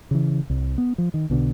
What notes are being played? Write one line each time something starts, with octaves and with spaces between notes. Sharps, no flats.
C#3 E3
C2
B3
F3
D#3
B1 B2 D3